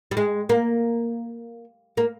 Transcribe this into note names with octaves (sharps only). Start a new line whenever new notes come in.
G3
G#3
A#3
A#3